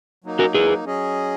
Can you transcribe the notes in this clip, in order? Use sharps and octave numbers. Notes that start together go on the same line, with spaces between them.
F#3 A#3 D#4
F#4 A#4
G#4 B4
F#3 C#4 G#4 D#5